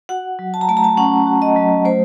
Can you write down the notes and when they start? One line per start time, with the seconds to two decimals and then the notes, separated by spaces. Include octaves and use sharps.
0.09 F#4 F#5
0.39 F#3
0.54 A5
0.61 A#5
0.69 A3 A5
0.77 A#5
0.84 A5
0.97 C#4 F#5
1.27 F#4
1.42 D#5
1.56 F#3
1.85 A3 C5